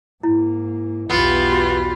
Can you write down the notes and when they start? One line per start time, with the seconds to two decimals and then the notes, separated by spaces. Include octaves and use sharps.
0.23 G#2 A#3 E4
1.10 B1 E2 B3 F4 G4
1.52 F#4